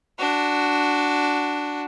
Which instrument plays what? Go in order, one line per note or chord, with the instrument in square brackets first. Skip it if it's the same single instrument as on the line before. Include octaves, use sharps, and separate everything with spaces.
[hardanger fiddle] D4 F#4